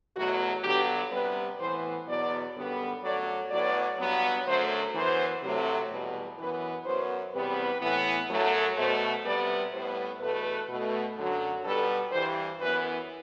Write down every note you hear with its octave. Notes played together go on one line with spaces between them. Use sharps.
E2 B2 F#3 A3 F#4
G2 D3 F#3 B3 G4
C3 G3 B3 B4
A2 E3 B3 C5
E2 B2 F#3 B3 D5
F#2 D3 G3 B3
F#2 F#3 A3 D5
A2 F#3 B3 D5
G2 F#3 B3
F#2 D3 F#3 A3 C5
F#2 E3 B3 C5
C3 F#3 A3
E2 B2 G3 B3
F#2 E3 B3 B4
F#2 F#3 B3 C5
E2 C3 G3 B3 B4
A2 E3 B3
F#2 F#3 A3
B2 A3 C5
C3 G3 B3 D5
A2 G3 B3 C5
E2 B2 A3 B4
B2 A3
F#2 D3 F#3
B2 G3 B3 A4
G2 E3 G3 C5
F#2 E3 B3 B4